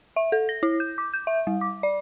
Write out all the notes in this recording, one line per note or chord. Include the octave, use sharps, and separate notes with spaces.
E5
A4
A#6
E4
G6
D6
G6
E5
G3
D6
D5